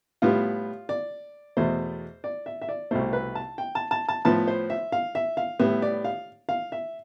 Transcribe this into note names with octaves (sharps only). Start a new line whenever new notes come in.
A2 G3 B3 F4
D5
E2 B2 A3 C5
D5
E5
E5
D5
C2 B2 A3 C5
B4
A5
G5
A5
A5
A5
A2 F3 B3 A5
C5
E5
F5
E5
F5
A2 G3 B3 E5
D5
F5
F5
E5